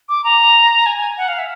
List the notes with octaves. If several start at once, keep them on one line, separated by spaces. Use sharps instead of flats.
D6
A#5
G#5
G#5
F#5
F5
E5